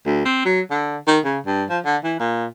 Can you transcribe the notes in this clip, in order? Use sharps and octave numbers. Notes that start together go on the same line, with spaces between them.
D2
C4
F#3
D3
D#3
C#3
G2
F3
D3
E3
A#2